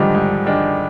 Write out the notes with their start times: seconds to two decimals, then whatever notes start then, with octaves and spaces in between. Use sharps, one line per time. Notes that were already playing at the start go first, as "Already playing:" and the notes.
Already playing: G#2 D3 D#3 F3 G3 G#3 D4
0.15 G#2
0.46 D#3 G#3 D4